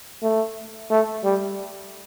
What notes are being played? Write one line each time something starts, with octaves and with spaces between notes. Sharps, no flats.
A3
A3
G3